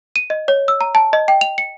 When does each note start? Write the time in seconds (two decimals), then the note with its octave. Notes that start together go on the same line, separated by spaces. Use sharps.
0.16 D#7
0.30 D#5
0.48 C#5
0.68 E6
0.81 A#5
0.95 A5
1.13 D#5
1.28 G5
1.41 F7
1.58 C#7